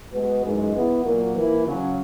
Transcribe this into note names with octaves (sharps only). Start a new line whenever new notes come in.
G#3 B3 F#4 B4
F#2 E3 G#3 D#4
E3 B3 E4
A#2 F#3 A#3
E3 A#3 E4
C#3 F#3 C#4